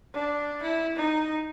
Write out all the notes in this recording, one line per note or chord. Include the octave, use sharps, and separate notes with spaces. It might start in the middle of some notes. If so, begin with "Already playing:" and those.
D4
E4
D#4